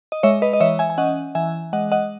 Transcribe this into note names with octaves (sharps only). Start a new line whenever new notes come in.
D#5
G#3 C#5 E5
B4 D#5
D#5
E3 C#5 E5
E5 G#5
G#5
C#4 D#5 F#5
E3 E5 G#5
G#3 D#5 F#5
D#5 F#5